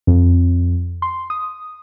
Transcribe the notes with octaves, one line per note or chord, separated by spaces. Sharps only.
F2
C6
D#6